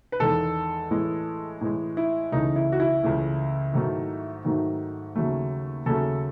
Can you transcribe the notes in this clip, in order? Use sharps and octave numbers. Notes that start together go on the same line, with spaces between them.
B4
E2 D#3 G#3 A4
A2 E3 G#3
A2 E3 G#3
E4
C#2 C#3 E3 A3 D#4
E4
F#4
E4
C#2 C#3 E3 A3
G#2 D#3 F#3 A3
G#2 D#3 F#3 A3
D#2 C#3 F#3 A3
D#2 C#3 F#3 A3 A4